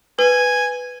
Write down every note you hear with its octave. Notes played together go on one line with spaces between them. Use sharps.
B4 G#5